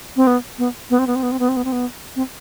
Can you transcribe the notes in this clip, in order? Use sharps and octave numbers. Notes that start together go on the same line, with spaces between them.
C4
B3
B3
B3
C4
B3
C4
B3
C4
B3
C4
B3
C4
B3
C4